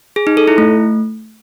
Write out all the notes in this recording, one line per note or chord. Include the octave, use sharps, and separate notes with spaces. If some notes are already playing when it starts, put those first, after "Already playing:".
G#4
D#4
A4
E4
A3